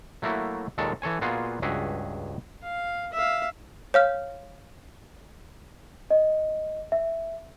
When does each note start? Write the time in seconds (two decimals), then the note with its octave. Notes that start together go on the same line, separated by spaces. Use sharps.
0.22 F#3 A3 A#3 E4 F#4
0.78 D#2 A#2 G#3 A4 C#5 A5
1.02 E3 A4 C#5 G#5
1.21 A#2 B3 F4 F#4 G#4
1.62 C#2 G2 F#4 G#4 E5
2.63 F5
3.13 E5 F5
3.94 C#5 F5 F6
6.11 D#5
6.92 E5